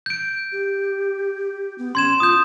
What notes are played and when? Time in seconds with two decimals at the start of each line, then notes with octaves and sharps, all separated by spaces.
0.06 G6 D7
0.52 G4
1.78 B3
1.95 C#4 C6 G#6 E7
2.20 F4 D#6 G6